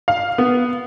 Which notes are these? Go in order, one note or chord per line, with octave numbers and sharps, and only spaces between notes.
F5
B3